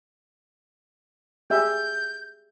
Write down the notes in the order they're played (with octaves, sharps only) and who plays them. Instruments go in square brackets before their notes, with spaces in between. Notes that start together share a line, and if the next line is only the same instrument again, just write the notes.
[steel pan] G4 G#4 E5 [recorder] G6